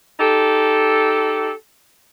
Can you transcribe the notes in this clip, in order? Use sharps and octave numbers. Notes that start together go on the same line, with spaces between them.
D#4 G4 A4